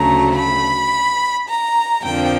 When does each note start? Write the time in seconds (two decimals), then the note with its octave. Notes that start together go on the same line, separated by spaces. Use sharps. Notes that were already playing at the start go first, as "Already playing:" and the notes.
Already playing: D2 C#3 F#3 A3 A#5
0.36 B5
1.49 A#5
2.05 F2 D3 F3 A#3 G5